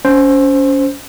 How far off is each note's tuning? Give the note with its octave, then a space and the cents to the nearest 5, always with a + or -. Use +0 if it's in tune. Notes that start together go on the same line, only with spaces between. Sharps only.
C#4 +25 C5 +0